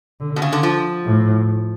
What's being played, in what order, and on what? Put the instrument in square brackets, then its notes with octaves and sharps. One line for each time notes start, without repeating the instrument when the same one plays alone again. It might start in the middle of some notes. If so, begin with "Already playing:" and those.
[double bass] D3
[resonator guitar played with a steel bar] B2
C#3
D3
F3
[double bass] A2